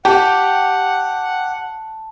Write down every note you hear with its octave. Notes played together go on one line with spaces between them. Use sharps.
G4 F#5 A5